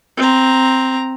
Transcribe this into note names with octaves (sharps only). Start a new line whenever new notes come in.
C4 A#5